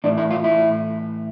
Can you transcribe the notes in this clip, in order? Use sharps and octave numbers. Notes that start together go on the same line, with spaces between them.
A2 E3 D4
E4
F4
E4